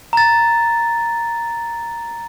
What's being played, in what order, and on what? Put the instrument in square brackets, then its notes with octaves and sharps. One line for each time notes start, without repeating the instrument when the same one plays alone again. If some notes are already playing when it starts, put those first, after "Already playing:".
[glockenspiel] A#5 A6